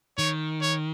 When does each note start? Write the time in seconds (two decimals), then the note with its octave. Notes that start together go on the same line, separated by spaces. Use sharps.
0.18 D#3 C#5
0.61 C#5